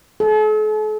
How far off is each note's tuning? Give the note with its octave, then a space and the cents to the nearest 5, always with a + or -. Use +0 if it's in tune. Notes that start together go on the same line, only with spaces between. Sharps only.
A4 -45